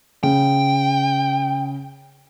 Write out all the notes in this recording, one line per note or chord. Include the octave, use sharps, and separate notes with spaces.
C#3 G5